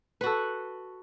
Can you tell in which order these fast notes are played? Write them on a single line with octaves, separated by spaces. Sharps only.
B4 F#4 A4